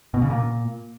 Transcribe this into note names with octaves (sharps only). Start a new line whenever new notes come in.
B2
C#3
A#2